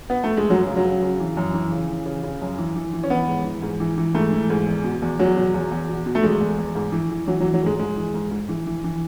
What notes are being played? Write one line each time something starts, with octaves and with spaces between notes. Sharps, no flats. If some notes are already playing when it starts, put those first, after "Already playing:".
B3
A3
G#3
F#2 F#3
C#3
F#3
C#3
C#3
E3
F#2
E3
C#3
E3
C#3
C#3
F#2
E3
E3
E3
C#4
E3 B3
G#2
E3
G#2
E3
E3
G#2 A3
E3
G#2
E2
B2
E2
E2 F#3
B2
E2
E2
B2
B2
A3
E2 G#3
E2
E2
G#2
E3
E3
E3 F#3
F#3
E3
F#3
G#2 G#3
G#2 G#3
E3
G#2
G#2
E3
E3
E3